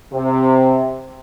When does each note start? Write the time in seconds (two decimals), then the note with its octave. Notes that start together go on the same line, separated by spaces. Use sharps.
0.12 C3